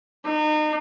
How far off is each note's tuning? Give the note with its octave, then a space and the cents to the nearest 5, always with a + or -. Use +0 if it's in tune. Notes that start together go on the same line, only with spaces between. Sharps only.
D#4 -35